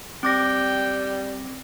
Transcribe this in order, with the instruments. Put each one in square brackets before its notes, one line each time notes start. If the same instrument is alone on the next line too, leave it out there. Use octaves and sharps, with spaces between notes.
[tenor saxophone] G3 [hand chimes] C4 D6 A#6 [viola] G5